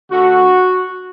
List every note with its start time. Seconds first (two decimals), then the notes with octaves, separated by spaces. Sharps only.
0.12 D3 A3 F#4